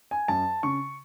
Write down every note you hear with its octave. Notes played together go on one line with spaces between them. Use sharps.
G#5
F#2 A5
C#3 C#6